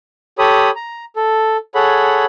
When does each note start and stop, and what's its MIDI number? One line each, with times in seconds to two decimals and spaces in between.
0.39 0.71 67
0.39 0.71 69
0.39 0.71 73
0.39 0.71 83
0.39 0.71 87
0.76 1.05 82
1.16 1.57 69
1.75 2.25 68
1.75 2.25 69
1.75 2.25 73
1.75 2.25 78
1.75 2.25 83